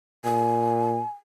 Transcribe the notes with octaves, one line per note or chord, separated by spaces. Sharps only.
A#2 G#5